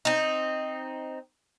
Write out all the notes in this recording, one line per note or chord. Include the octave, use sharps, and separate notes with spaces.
C4 D#4